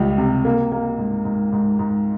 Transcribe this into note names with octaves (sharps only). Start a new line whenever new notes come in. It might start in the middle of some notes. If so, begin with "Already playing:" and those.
Already playing: C#2 G3
C3
A#3
A#3
G#2
G#2
G#2
G#2